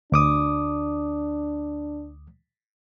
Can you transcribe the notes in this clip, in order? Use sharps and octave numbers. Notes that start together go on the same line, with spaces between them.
D2 D4 D6 D#6